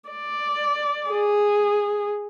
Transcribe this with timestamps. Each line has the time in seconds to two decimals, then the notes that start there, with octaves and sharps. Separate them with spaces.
0.10 D5
1.09 G#4